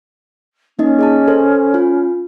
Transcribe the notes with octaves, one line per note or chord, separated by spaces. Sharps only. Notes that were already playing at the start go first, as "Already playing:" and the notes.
A#3 C#4 D#4 D#5
G#4 D#5 A5
A4 C5
F4